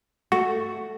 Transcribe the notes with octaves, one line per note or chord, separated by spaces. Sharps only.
A3 F#4